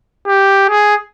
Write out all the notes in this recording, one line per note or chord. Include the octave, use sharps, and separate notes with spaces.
G4
G#4